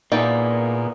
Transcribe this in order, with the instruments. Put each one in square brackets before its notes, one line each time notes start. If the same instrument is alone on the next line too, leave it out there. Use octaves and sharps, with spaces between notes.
[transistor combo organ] A#2 [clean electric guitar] A#3 B3 G#4 [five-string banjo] D#4 E4 G5 [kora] D5